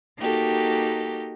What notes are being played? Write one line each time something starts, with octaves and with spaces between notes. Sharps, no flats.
A#3 D#4 F#4 G4 A4